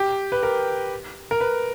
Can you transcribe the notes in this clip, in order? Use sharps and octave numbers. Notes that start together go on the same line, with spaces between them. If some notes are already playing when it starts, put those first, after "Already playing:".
Already playing: G4
B4
A#4
A#4
B4